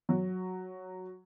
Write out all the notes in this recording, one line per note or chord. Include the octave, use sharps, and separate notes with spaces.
F#3